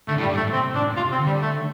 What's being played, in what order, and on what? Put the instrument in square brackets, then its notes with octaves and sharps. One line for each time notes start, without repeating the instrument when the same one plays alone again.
[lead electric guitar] D3 [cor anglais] A3
[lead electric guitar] A2
[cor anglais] G3
[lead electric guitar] G2
[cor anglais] A3
[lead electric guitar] A2
[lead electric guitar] C3 [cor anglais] C4
[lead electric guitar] A2 [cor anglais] D4
[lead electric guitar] C3 [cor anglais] F4
[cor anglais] C4
[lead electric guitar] D3
[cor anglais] G3
A3